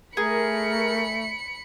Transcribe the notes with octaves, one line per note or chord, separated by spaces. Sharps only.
A3 G#4 A#4 B5 C#7